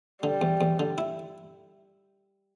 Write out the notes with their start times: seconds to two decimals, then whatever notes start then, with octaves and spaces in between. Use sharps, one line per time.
0.23 D3 G3
0.41 E2
0.61 E2
0.79 D3
0.98 E4